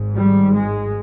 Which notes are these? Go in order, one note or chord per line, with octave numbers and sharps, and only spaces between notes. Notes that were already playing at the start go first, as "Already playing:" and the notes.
Already playing: G#1 G#2
G3
G#3